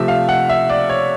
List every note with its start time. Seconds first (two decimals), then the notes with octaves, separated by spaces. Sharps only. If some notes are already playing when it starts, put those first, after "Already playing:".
Already playing: C3 F3 A3 E5
0.08 F5
0.29 F#5
0.49 E5
0.70 D5
0.90 C#5